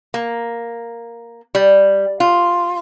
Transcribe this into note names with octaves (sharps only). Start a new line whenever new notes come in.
A#3
G3
F4